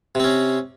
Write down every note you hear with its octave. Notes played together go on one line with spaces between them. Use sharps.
C3 C4 C#4